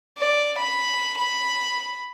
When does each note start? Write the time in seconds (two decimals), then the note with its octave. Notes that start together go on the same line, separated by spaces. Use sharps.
0.18 D5
0.58 B5
1.18 B5